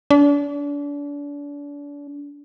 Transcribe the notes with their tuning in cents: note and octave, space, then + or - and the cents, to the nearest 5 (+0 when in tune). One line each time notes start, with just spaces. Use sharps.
D4 -35